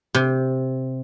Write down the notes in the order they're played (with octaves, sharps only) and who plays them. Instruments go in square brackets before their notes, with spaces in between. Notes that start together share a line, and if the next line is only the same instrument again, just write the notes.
[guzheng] C3